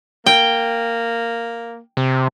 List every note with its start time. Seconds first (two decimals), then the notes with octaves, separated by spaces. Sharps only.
0.26 A#3 G5
1.97 C3